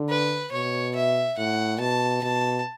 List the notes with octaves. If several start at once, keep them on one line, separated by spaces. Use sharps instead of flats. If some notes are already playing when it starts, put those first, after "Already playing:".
Already playing: D3
B4
B2 C#5
E5
A2 F#5
B2 A5
B2 A5